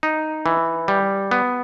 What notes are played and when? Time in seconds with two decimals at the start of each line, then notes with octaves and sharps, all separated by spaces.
0.03 D#4
0.46 E3
0.88 G3
1.31 B3